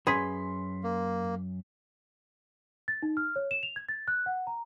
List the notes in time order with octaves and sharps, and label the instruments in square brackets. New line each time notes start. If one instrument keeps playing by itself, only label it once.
[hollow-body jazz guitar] F#2 C#4 B4 [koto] G#4 [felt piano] C6 B6
[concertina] A#3
[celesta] A6
D#4
F6
C#5
E7
F7
G#6
A6
F#6
F#5
A#5